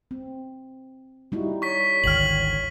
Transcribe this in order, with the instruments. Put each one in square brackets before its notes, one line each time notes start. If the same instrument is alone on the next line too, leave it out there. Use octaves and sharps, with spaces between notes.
[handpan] C4
[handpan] G3 D#4 E4 [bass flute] F#4
[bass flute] C#5 [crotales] C#6 B6
[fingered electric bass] G#1 D2 D#3 [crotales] F6 F#7